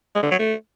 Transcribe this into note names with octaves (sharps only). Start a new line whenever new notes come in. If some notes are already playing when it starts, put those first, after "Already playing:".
G#3
D3
F#3
A3